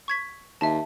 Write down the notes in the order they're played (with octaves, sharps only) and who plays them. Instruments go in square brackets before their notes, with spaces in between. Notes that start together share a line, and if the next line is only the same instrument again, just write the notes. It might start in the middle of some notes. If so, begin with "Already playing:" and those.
[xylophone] C#6 G#6 B6
[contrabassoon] D#2 [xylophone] E5 A5